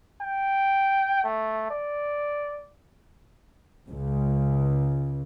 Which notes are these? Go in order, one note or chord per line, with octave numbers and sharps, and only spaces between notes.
G5
A3
D5
C#2